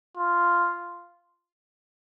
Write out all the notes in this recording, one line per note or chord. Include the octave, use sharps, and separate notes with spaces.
F4